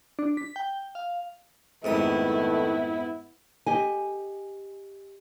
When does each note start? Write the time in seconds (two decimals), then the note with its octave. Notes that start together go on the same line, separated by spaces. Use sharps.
0.19 D4
0.37 B6
0.56 G5
0.95 F5
1.84 F2 G#2 D#3 A3 B3 E4 B4 D#6
3.66 G4 D#5 G#5